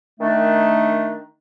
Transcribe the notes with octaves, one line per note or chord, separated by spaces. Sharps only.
D#3 A3 D4